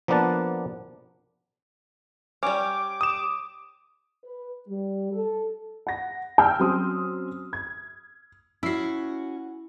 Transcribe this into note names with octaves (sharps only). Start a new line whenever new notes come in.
F3 A#3 B3 D4 F#5 A5
G3 C#4 D6
D#6 E7
B4
G3
A4
F#5 A#6
G5 E6 F6
F#3 C4 C#4 C6 D#6
G#6
C#4 E4 F#4 C7